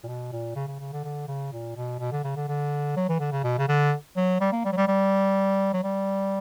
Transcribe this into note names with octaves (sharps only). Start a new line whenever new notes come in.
A#2
B2
A#2
C#3
C#3
C#3
D3
D3
C#3
A#2
B2
B2
D3
C#3
D3
D3
F#3
E3
D3
C#3
B2
C#3
D3
F#3
G3
A#3
G3
F#3
G3
G3
F#3
G3